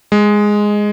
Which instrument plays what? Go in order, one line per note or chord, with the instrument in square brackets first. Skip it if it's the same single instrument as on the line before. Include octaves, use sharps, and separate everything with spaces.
[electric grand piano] G#3